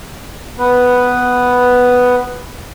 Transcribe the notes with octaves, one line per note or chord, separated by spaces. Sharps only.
B3 B4